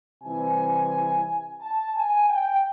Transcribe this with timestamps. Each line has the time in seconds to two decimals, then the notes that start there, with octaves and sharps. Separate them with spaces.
0.24 C3 E3 G3 C4 G#5
1.61 A5
1.96 G#5
2.30 G5